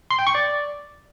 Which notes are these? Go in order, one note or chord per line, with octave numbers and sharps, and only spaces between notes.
C6
G5
C#6
D5